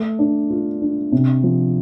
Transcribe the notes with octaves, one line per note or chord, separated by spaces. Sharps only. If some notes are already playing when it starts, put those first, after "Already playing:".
Already playing: A3
D4
F4
D4
C3
F3